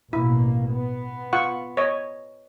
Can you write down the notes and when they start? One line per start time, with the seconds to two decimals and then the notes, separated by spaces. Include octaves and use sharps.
0.13 A1 B2 A#3 E4
0.70 B3
1.33 F4 F#5 C#6
1.77 C#5 D#5